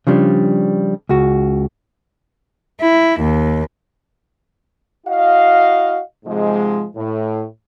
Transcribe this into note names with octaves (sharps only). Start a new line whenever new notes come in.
C#3 F3 G3 D4
C#2 F#4
E4
D#2
E4 F#4 D#5 F5
G#2 C3 F3 G#3
A2